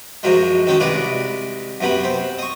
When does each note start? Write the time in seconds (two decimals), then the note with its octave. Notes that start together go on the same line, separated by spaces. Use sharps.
0.23 F#2 F3 F#3 G#3
0.67 D#3 C#4 F#4
0.80 C2 G#3 G#4 B4 D5
1.81 F#2 C3 B3 F#5 B5
2.04 C4
2.38 D#5 C#6